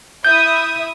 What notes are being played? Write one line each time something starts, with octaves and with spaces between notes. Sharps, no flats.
E4 E5 D#6 G6